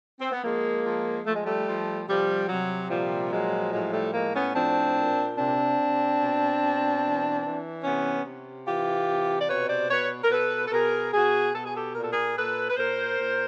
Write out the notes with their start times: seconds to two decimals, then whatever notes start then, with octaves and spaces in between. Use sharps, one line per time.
0.19 C4
0.32 B3
0.43 F3 G#3 A#3
0.84 F3
1.25 F3 A3
1.34 G#3
1.44 G3 A3
1.67 F3
2.07 C3 F3 G3
2.48 C3 F#3
2.89 A#2 F3 G3
3.31 F3 F#3 G#3
3.72 A2 F#3 G#3
3.92 G3 A3
4.14 A2 G#3 A#3
4.34 B3 C#4
4.54 F3 C4 D4
4.96 A#2
5.36 C3 C4 D4
5.78 C3
6.19 B2
6.61 B2
7.01 E3
7.42 E3
7.83 C3 B3 C#4
8.25 C3
8.66 E3 F4 G4
9.07 C3
9.39 D5
9.48 B2 B4 C#5
9.68 C5 D5
9.89 B2 B4 C#5
10.22 A#4
10.30 B2 A4 B4
10.67 A4
10.71 B2 G#4 A#4
11.12 B2 F#4 G#4
11.54 B2 A4
11.65 G#4
11.74 G4 A4
11.95 A#2 A#4
12.03 A4
12.11 G#4 A#4
12.36 A#2 A4 B4
12.69 B4
12.77 A#2 A#4 C5
13.18 A#2